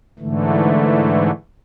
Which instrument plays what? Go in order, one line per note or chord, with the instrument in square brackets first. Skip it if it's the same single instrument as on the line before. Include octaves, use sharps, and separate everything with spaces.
[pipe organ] G#2 D3 E3 A3